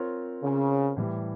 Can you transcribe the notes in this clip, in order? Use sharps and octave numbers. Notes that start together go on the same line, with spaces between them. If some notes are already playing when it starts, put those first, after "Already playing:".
Already playing: C4 F4 A#4 C#5
C#3
A2 E3 G3